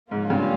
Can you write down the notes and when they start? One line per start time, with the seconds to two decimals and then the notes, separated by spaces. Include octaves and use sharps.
0.11 G#2 F3 A#3 C#4 F4
0.30 G2